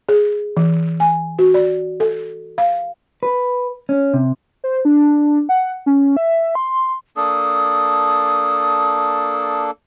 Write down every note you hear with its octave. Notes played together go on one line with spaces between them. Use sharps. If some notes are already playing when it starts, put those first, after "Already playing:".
G#4
E3
G#5
F#4
D5
A4
F5
B4
C#4
C3
C5
D4
F#5
C#4
E5
C6
A#3 D4 A4 D#6